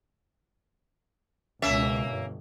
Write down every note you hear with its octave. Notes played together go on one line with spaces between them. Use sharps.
C#2 B2 A#3 C#4 E5
G1